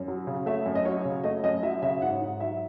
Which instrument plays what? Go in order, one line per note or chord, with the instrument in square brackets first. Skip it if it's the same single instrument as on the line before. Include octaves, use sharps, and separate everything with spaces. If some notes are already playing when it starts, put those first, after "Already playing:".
Already playing: [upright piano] F#2
F#3
C#3
A3 E5
F#2
D#5
F#3 C#5
C#3
A3 D#5
F#2 D#5
F#3 E5
C#3 E5
G#2 F#5
G#2
F#3 E5